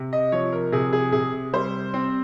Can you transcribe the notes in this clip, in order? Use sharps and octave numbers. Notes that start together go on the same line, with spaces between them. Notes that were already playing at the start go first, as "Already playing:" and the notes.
Already playing: C3
D#5
F3 C#5
A#4
C3 G#4
G#4
C3 G#4
G3 C5
C4